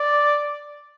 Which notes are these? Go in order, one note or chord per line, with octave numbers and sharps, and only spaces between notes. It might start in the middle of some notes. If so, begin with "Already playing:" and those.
Already playing: D5